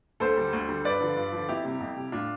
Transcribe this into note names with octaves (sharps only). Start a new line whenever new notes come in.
D2 A4 C5
D3 G3
D2
D3 G3
G2 B4 D5
D3 F3
G2
D3 F3
F2 E4 G4
C3 G3
F2
C3 G3
A2 D4 F4